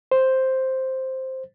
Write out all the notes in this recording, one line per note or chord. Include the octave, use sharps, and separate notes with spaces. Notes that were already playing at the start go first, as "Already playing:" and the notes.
C5